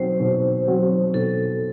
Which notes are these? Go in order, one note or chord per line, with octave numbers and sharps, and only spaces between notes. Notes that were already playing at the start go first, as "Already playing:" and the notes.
Already playing: B2 F#3 C4 F#4 C5
B2
F#3 C4 F#4
B2 A4